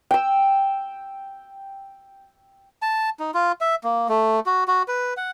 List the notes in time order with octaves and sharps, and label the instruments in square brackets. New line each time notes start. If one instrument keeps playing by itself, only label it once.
[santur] G5 E6
[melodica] A5
D#4
F4
E5
A#3
A3
F#4
F#4
B4
F#5